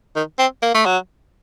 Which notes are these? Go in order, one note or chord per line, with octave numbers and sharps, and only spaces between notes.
D#3
C4
A#3
A3
F#3